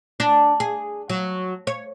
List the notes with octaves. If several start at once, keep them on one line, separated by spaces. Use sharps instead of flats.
D4
G#4
F#3
C#5